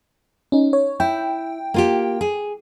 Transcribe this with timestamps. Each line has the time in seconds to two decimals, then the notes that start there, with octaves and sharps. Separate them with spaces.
0.52 C#4 D#4
0.73 C#5
1.00 E4 G5
1.74 A#3 F4 G4
2.21 G#4